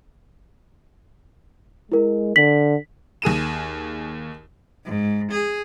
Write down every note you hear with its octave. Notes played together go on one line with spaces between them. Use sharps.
G#3 E4 A#4
D3 B6 F#7
D#2 G#4 D#7 E7
G#2
G#4